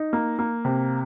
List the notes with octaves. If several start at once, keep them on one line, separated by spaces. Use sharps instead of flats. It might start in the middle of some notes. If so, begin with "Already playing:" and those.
Already playing: D#4
A#3
A#3
C3